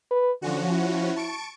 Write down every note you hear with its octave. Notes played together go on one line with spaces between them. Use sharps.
B4
D3 F3 C#4 F#4
E4
A5 C#6 D7